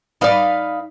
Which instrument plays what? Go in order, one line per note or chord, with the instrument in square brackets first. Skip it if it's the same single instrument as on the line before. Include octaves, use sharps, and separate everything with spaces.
[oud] D#4 D5 [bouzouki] B4 F5